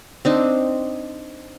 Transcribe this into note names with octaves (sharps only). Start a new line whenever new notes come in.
C4 D4 D#4